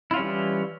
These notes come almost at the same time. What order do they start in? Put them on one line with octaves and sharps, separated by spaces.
E4 F4 C#4 G3 E3